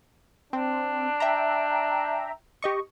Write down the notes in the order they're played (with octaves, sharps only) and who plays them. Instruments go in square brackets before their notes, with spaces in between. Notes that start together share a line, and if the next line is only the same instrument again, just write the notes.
[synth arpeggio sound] C4 [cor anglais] D4
[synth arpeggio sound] E5 G5 A#5
G4 D#5 C#6